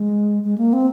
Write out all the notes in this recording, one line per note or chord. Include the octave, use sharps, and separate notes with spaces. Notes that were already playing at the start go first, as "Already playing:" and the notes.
Already playing: G#3
G#3
A#3
C4